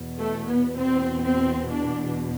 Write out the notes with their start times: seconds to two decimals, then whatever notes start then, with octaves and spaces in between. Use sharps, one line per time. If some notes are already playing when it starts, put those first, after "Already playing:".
Already playing: E2 B2
0.19 A3
0.50 B3
0.80 C4
1.26 C4
1.71 D4